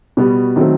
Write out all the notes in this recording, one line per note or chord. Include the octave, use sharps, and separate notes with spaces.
B2 G3 B3 F#4
D#3 F#3 A3 C4